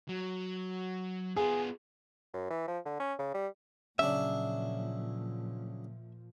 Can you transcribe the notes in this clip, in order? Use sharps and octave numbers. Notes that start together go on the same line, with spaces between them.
F#3
B3 F4 G#4
F#2
E3
F3
D3
C#4
C#3
G3
A#2 C#3 F3 F#3 D4 E5